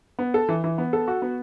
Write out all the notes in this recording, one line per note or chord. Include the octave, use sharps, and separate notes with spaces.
B3
A4
E3
E3
B3
A4
F#4
B3